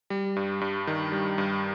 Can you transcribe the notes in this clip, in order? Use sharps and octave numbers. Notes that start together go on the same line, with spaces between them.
G3
G2
G2
D#3
G3
G2